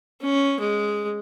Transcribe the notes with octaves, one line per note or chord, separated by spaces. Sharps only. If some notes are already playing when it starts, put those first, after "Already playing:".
C#4
G#3